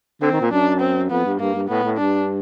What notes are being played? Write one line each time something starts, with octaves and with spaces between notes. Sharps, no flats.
D3 C4
D#3
A#2
F#2 D4
C4
F2 B3
G2
G2 A#3
G2
A2 B3
A2
G2 D4